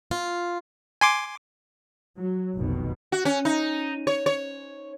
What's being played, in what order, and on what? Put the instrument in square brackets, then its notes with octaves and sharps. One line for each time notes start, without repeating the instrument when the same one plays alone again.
[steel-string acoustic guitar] F4
[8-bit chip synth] G#5 C6 D6
[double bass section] F#3
F1 B1 B2 D#3
[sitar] F#4
C#4
D#4
C#5
C#5